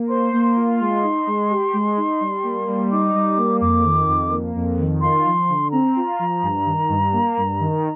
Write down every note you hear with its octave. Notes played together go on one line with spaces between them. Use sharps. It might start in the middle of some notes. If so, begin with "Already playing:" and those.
Already playing: A#3
C5 C6
A#3
F4
G#3 C6
D#4
G#3
G4
G#3
D#4
G3
A#3
G3
D#4 D6
G3
A#3
F2 D6
D#3
F2
A#3
F2
D#3
F4 C6
F3
D3
C4 A#5
F4
F3
G2
D#3
G2
A#3
G2
D#3